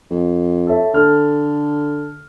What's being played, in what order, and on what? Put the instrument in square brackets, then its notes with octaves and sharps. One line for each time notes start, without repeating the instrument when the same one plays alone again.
[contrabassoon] F2
[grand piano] A4 C#5 E5
[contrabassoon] D3 [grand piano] A4 F6